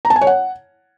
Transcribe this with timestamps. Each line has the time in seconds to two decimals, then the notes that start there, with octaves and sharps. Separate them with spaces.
0.05 A#5
0.10 A5
0.16 G#5
0.21 C#5
0.27 F#5